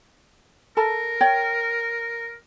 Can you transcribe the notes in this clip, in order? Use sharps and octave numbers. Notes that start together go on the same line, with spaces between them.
A4 A#4 A5 A#5
C#5 G5